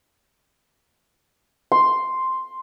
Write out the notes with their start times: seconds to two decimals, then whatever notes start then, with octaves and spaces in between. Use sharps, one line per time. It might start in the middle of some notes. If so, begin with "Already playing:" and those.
1.72 C6